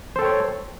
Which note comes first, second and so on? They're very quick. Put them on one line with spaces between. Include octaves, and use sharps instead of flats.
C5 A4 G5 C#5